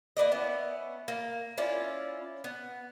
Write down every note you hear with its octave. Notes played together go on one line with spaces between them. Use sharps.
A#3 B3 D5 D#5
B3 C#4 E4
A#3
C#4 E4 F4 D5
B3